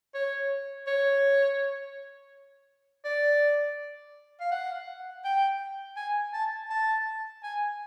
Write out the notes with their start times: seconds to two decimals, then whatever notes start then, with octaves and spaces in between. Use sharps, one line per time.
0.14 C#5
0.87 C#5
3.05 D5
4.40 F5
4.51 F#5
5.25 G5
5.96 G#5
6.33 A5
6.70 A5
7.43 G#5